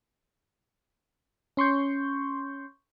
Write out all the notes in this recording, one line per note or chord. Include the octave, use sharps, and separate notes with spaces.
C#4 C6 C#6 G6